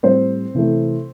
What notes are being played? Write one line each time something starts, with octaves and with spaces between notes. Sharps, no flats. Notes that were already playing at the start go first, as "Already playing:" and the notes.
A2 G3 C4 C5
C3 E3 A3